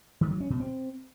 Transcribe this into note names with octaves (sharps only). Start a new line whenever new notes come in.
D#3
F#3
C#4
B2
C4